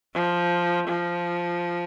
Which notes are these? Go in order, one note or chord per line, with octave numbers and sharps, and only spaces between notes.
F3
F3